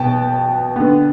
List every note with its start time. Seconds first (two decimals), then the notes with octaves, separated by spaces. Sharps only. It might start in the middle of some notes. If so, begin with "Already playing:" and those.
Already playing: B2 B3 G5 A5
0.76 D3 B3